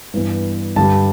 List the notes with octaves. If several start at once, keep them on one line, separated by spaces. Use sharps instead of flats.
G2 E3 B3
G2 D3 G3 A5